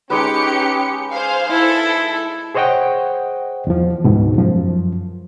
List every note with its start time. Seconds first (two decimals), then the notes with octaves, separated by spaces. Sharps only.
0.10 G#3 C#4 D#4 G4 B4 C#7
1.13 G#4 C5 F5
1.51 E4 A4
2.55 G#4 C5 C#5 D#5 F#5 G5
3.67 E2 F3
4.04 D2 G#2 B2
4.38 F#2 F3